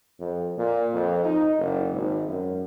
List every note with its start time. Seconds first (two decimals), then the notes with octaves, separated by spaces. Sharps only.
0.20 F2
0.57 A#2
0.93 F2
1.24 D#4
1.58 F#1
1.93 G#1
2.28 F#2